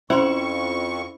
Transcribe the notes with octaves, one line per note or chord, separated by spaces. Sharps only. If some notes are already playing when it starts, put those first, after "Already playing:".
F2 C#4 E4 F4 C5 C6 C#6